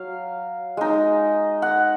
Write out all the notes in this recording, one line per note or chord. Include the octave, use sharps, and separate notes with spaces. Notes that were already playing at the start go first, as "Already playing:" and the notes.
Already playing: F#3 F5
G#3 D#4
F#5